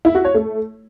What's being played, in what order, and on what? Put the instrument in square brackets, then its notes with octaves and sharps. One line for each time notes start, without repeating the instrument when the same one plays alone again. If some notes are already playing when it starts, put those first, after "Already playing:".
[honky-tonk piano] E4
F#4
C#5
A3